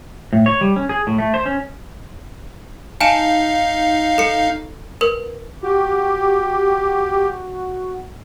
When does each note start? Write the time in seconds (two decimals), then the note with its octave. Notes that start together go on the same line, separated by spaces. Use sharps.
0.33 A2
0.46 C#5
0.61 G3
0.76 C#4
0.89 G#4
1.07 A2
1.18 A3
1.34 C5
1.46 C#4
3.01 D#4 F5 G#5 A5 E7
4.18 A4 C#7
5.01 A#4 B4
5.63 F#4 G4